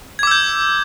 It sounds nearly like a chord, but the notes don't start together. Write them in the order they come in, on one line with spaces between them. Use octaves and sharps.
G#6 D6 E6 G6